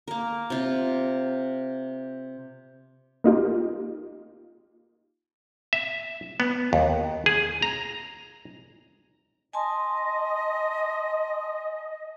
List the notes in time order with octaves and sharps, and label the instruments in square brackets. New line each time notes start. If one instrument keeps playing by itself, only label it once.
[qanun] A#3 A#4
C3 F4
[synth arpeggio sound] A#3 D#4 F4 G4
[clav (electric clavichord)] E5
B3
D#2
G#4
A#5
[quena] D#5 [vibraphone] G#5 A5 C6